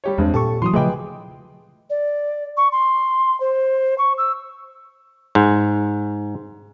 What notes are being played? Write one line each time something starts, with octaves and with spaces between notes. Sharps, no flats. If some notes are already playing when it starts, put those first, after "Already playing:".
G3 G4 C#5
E2 G2 G#3 C4
A#2 G4 A4 A5 C#6
E3 F#3 C6 D#6
C#3 F3 A3 G#4 B4 D#5 G5 D6
D5
C#6
C6
C5
C#6
E6
G#2